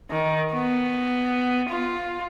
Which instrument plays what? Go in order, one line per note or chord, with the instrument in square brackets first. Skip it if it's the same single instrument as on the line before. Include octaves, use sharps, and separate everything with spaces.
[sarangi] D#3
B3
F4